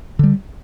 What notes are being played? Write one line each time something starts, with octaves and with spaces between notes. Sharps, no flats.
D3 G3